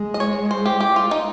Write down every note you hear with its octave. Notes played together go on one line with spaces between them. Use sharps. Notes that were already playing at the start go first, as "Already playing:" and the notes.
Already playing: G#3
D#5
C#5
C5
G4
G4
F4
D#4